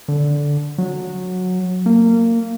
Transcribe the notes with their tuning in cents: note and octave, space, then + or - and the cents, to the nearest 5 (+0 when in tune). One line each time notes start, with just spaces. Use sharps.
D3 -10
F#3 -15
A#3 -20